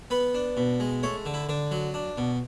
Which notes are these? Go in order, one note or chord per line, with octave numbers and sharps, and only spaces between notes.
B3 B4
D4
B2
G#3
A3 C#5
D3
E4
D3 D4
F#3
D4
B2